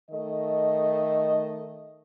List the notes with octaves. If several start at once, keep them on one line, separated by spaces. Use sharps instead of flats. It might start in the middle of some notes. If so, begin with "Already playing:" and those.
D#3 A3 A4 D#5